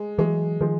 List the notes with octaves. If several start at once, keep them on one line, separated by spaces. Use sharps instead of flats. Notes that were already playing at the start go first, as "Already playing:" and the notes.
Already playing: G#3
E3 F#3 G#3
D#3 F3 G#3